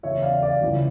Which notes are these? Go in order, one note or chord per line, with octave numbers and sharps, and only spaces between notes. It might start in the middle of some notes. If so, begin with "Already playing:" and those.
E2 C#3 E3 C#5 E5
D5 F5
D5 F5
C#2 C#3 E3